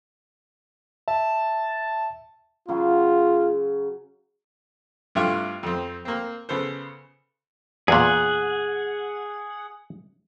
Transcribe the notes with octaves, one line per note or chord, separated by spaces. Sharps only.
E5 A5
C#3 F#3 F4
G2 C3 A3 E4 F4
F2 C4
A#3 C4
C#3 B3 A4 C5
E2 A#2 G#4 F#5